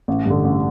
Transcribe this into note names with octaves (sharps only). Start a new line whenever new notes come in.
A1
G2 D3
A1